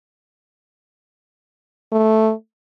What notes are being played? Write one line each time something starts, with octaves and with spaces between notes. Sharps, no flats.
A3